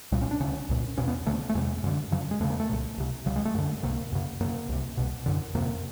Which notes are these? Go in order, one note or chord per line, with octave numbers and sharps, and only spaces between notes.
C2 A#2 G3
C#4
D4
D2 C#3 C#4
C2 A#2
E2 B2 C#4
B3
D2 C#3 A3
A3
E2 C3 G#3
F#2 D3
F2 C#3 F#3
G#3
E2 C#3 A3
A#3
A3
C2 A#2
C2 C3
C#2 C#3 G3
G#3
A3
F#2 D3
C2 C3 A#3
F#2 C#3
F#2 C#3 A#3
C2 C3
C2 B2
F#2 D3
F2 C3 A#3